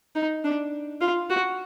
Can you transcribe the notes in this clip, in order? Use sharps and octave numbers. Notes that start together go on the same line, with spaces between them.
D#4
D4
F4
F#4